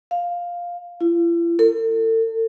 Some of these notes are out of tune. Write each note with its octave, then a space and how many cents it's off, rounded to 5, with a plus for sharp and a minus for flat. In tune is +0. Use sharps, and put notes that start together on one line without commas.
F5 +5
E4 +45
A4 +40